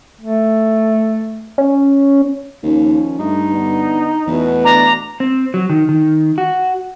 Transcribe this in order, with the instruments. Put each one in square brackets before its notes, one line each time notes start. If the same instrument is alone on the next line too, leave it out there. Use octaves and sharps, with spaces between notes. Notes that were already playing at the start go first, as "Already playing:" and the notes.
[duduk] A3
[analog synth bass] C#4
[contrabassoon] D#2 [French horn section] D#3 F3 C#4
[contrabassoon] G2 [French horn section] A3 [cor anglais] D#4
[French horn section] D3 B3 D4
[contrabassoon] E2 [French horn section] B2 A3 B4
[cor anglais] D4 [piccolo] A#5
[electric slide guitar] C4
F#3
D#3
D#3
F#4